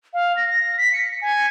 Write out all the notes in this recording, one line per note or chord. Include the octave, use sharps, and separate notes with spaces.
F5
A#6
A#6
B6
C#7
G#5